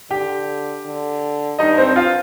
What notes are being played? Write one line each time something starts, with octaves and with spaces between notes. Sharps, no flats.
D3 G4 G5
D3
G2 D#4 D#5
C4 C5
F4 F5